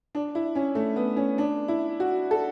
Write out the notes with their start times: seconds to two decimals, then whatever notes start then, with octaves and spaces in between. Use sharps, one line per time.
0.15 D4
0.35 E4
0.55 C#4
0.75 A3
0.96 B3
1.16 C#4
1.38 D4
1.68 E4
2.00 F#4
2.31 A4